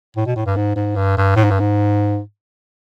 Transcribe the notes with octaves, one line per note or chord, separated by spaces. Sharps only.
A2
B2
A2
G2
G#2
G#2
G2
G2
A2
G#2
G2
G#2